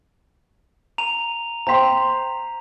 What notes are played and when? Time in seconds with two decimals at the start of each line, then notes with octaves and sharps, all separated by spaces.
0.98 A#5 D#7 F7
1.67 C5 G5 A#5 C6 B6